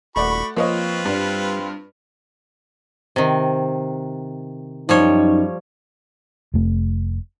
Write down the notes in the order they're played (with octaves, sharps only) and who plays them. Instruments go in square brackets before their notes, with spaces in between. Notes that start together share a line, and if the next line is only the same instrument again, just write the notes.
[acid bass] D#1 [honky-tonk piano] A3 D5 F#5 [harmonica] F#4 B5 C#6
[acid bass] F3 [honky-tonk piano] A#3 C#5 D#5 [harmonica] C4 F4 B4
[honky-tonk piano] G2 [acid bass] G3
[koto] C3 D#3
[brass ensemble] F#2 D#4 [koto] F3 G3 C#5
[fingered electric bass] F1 A3